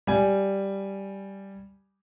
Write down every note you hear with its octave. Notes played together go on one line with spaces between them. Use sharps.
G3 G#5